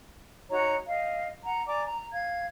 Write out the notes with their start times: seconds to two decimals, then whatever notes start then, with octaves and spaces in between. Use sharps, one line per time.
0.50 D#4 F#4 C#5 A#5
0.88 D#5 F5
1.44 F#5 A#5
1.67 D5 G#5 A#5 D6
1.85 A#5
2.12 F5 G#6